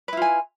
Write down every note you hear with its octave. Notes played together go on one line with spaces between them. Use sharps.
E4 F4 B4 G#5